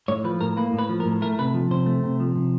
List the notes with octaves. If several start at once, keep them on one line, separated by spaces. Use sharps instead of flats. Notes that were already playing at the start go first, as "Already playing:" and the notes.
A2 C#5
F3 B4
A2 A#4
A#3 B4
A2
B4
F3
A#4
A2
A3 A#4
C3 B4
F3
C3 C5
A3
C3
F3
C3